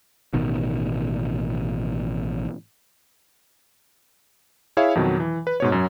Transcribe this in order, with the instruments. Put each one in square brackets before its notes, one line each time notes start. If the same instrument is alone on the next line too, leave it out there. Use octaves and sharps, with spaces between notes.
[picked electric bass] A1 B2 D#3
[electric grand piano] E4 G#4 C#5 E5 F5
F2 B2 D#3 F#3
E3
B4
G#2 B2 C#5
F#2 F#3